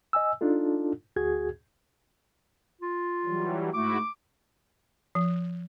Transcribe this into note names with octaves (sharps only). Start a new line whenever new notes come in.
D#5 G#5 E6
D4 D#4 F4 A4
D2 F#4 G#4 G#6
F4
E3 F#3 G3
G#2 A3 E4 F#4 D6
F3